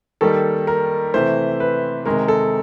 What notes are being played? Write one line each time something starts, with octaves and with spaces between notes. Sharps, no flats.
D#3 G3 A#3 A4
A#4
C3 E3 A3 C5
B4
C3 D#3 G#3 A#4
A4